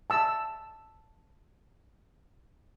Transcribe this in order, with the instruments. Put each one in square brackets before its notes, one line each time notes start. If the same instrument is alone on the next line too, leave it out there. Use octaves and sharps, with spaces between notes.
[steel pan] A5 E6